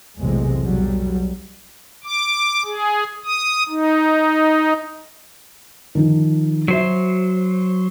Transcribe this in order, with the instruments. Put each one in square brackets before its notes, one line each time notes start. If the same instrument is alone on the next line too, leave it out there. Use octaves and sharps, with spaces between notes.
[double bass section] B1 E2 A2 C3 E3 G#3
B1 F#3 G3
[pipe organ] D6
G#4
D#6
D#4
[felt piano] D#3 F3 D#4
[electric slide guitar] F#3 C5 [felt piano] F#4 E5